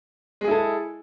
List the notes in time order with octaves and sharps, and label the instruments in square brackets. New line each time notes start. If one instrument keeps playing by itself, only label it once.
[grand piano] G#3
G#4
E4
A4